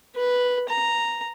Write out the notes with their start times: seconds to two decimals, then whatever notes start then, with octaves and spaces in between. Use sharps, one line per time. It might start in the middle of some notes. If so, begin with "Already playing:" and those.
0.16 B4
0.68 A#5